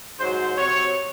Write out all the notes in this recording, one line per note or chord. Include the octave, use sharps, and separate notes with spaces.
G#2 F#3 C5
C3 F#3 C#5